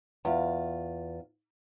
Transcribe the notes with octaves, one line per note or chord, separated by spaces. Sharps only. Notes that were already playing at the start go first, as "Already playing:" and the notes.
E2 F4